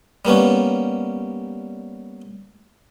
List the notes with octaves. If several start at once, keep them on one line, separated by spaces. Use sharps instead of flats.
G3 A#3 B3 C#4